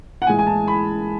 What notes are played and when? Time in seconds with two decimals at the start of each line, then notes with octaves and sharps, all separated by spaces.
0.22 F#5
0.27 A2 E3 G#3 G#5
0.38 G#5
0.47 A5
0.68 B5